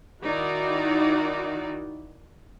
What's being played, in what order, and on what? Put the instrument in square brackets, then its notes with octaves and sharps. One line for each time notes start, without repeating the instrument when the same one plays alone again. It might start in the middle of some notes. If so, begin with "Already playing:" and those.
[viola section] D#3 D#4 E4 F#4 D5